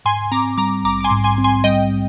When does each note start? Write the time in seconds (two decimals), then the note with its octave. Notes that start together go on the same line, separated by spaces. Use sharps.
0.05 G#2 G#5 C6
0.32 C4 A#5 D6
0.58 G3 A#5 D6
0.84 A#1 A#5 D6
1.00 D6
1.04 G#5 C6
1.11 G#2
1.24 G#5 C6
1.38 C4
1.44 G#5 C6
1.64 G3 D#5 G5